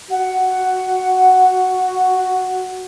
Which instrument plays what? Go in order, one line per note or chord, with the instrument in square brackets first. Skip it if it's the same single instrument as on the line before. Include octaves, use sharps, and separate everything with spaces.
[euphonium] F#4 [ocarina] F#5